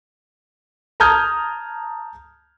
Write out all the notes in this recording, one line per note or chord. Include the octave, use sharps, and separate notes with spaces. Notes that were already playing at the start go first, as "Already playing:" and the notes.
A5 A#5 D#6 F6 G6 G#6